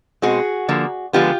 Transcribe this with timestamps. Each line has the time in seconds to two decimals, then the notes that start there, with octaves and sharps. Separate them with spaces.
0.22 B2 G#3 C4 F#4 G#4
0.68 D3 F3 A#3
1.13 D3 F3 G#3 B3 F4 G4